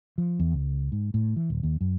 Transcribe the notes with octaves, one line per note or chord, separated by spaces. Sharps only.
F3
E2
C#2
G#2
A2
E3
D#1
D#2
F#2